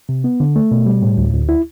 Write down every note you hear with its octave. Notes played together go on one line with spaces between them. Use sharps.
C3
B3
D3
A3
B2
G3
A2
D2
D2
E4